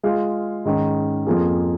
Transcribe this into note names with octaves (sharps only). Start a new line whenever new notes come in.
G#3 F4 G#4 F5
G#2 D#3 C#4
F2 F3 A#3 F4 G#4